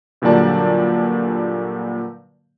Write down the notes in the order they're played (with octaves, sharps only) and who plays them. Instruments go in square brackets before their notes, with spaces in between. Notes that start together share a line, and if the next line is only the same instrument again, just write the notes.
[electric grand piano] G2 A#2 D3 F#3 D5 A5